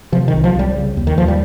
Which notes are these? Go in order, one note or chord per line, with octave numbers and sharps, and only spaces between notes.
C3 F3
D#3
C2
F3
C2 G3
C#3
D#2
D#3
D#2 F3
G3